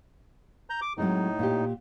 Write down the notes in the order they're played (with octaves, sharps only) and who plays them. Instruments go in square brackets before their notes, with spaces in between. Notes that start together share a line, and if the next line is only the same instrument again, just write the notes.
[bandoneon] A#5 G6
D6
[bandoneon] A2 D#4 [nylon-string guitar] F#3 G#3 C4
[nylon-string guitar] A#2 G4